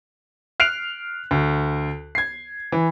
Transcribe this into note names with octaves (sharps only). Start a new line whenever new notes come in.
F6 F#6 C7 D7 F7
D2
G#6 C7
E3